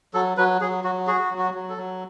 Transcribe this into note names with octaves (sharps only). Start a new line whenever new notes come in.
F#3 A4
F#3 B4
F#3 G#4
F#3 F#4
F#4 G#4
F#3
F#4
F#3
A4
F#3